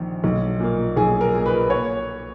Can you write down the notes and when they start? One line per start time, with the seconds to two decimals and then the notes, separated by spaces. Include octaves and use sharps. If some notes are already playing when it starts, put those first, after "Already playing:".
Already playing: A#1 D#3
0.24 B1
0.60 A#2 A#3
0.96 B1 G#4
1.21 A#4
1.34 A#2 A#3
1.46 B4
1.70 C#5